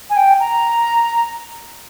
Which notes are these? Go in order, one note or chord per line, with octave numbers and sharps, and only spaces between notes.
G#5
G5
A#5